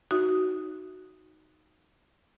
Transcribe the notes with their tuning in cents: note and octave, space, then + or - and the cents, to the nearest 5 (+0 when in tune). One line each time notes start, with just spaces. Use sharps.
D#4 +0 F#4 +0 E5 +5